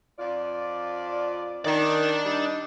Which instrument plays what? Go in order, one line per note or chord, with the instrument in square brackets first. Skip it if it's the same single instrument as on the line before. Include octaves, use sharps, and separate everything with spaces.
[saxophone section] F2 F4 D5
[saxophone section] D#3 [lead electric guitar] D4 D5
[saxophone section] G3 D#4